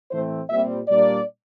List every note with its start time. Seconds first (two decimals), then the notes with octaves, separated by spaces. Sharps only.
0.11 A2 E3 A3 C4 C5
0.50 A#2 G3 C4 E5
0.88 A#2 G3 A#3 D4 D5